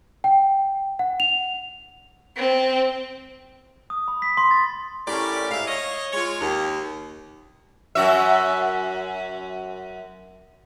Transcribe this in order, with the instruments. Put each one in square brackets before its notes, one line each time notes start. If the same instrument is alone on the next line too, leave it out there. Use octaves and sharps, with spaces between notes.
[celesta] G5
F#5
F7
[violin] C4
[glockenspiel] D#6
B5
B6
C6
A6
[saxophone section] A2 C#4 G4 A#4 D5
G#2 E5 F5
C#5 D#5
G#3 F4 C#5
D#2
[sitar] F#2 F#4 E5